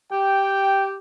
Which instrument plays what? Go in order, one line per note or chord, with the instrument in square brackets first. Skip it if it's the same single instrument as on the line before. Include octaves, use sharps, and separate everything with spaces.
[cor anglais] G4 [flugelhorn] G5